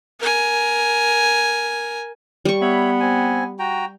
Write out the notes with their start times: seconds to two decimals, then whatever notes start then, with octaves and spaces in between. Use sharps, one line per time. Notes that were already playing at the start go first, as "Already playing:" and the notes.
0.20 A#4 G#5
2.45 G3 C#6
2.61 B3 C#5 E5 B5
3.00 C4 G#5
3.59 F#4 G5 A#5